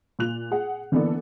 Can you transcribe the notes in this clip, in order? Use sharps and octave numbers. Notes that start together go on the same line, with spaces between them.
A#2 F4 F#6 F7
G#4 F#5
D3 E3 A#3 B3 D4 A4